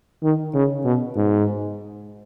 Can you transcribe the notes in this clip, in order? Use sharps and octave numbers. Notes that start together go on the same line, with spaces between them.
D#3
C#3
B2
G#2